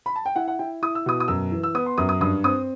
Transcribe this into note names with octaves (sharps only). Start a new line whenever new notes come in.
B5
A5
G5
E4 F#5
F#5
E4 G5
E4 D#6
E6
B2 D#6
D#6
F#2 E6
E3
E6
B3 D#6
C6
F#2 D#6
D#6
G2 D#6
C4 D#6